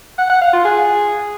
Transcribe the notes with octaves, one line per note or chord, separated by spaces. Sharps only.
F#5
F#5
F5
F4
G#4